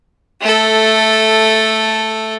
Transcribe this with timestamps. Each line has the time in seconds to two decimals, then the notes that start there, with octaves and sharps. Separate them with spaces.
0.42 A3 A4